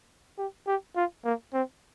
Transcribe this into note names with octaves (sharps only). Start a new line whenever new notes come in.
G4
G4
F4
A#3
C4